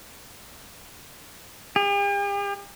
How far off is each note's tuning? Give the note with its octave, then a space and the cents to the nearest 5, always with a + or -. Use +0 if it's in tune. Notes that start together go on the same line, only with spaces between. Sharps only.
G4 +45